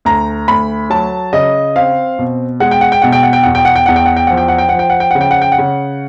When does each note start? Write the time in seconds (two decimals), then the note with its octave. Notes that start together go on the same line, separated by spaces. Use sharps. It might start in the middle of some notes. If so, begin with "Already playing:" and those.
0.05 D2 A#5
0.48 D2 B5
0.90 F#3 A5
1.33 C#3 D#5
1.76 C4 F5
2.19 B2
2.60 G#3 F#5
2.71 G5
2.81 F#5
2.92 G5
3.02 B2 F#5
3.12 G5
3.23 F#5
3.33 G5
3.43 E2 F#5
3.55 G5
3.65 F#5
3.76 G5
3.86 E2 F#5
3.96 G5
4.06 F#5
4.17 G5
4.27 F3 F#5
4.37 G5
4.48 F#5
4.58 G5
4.69 F3 F#5
4.79 G5
4.90 F#5
5.00 G5
5.11 C#3 F#5
5.21 G5
5.31 F#5
5.42 G5
5.52 F#5
5.58 C#3